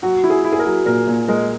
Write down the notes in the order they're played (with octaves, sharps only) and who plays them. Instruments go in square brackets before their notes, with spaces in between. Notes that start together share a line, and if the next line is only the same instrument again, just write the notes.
[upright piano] F#3 [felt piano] F#4
[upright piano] E4
[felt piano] G#4
[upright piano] E4
[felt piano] G#4
A#4
[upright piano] F#3
[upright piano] A#2 [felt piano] A#4
[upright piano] A#2
[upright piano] G#3 [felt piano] A#4